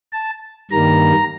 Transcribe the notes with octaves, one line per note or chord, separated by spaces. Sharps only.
A5
G2 D#3 G3 A#3 A#5